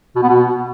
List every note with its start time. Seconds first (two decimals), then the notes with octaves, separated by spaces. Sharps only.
0.16 B2
0.23 B3
0.30 B2